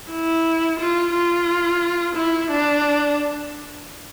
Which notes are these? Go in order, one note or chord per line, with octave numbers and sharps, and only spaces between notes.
E4
F4
F4
E4
D4